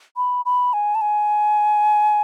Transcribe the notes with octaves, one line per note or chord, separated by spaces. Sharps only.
B5
B5
G#5
A5
G#5